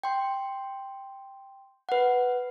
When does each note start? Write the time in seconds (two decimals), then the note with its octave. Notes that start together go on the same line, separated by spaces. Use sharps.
0.04 G5 C6
1.89 B4 F#5